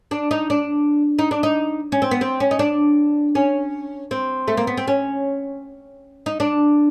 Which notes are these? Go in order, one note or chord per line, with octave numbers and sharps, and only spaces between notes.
D4
D#4
D4
D#4
D4
D#4
C#4
C4
B3
C4
C#4
D#4
D4
C#4
C4
A3
A#3
B3
C4
C#4
D#4
D4